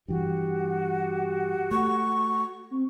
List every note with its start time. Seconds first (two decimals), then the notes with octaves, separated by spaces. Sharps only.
0.08 G2 E3 F#4 G4
1.71 A3 C#6
2.71 C4